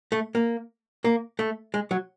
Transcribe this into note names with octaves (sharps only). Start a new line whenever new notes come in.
A3
A#3
A#3
A3
G#3
F#3